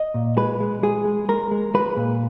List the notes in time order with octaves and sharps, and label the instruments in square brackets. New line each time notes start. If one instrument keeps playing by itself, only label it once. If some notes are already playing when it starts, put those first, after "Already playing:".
Already playing: [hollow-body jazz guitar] D#5
A#2
G#3 B4
G#3
G#3 G#4
G#3
G#3 A#4
G#3
G#3 B4
A#2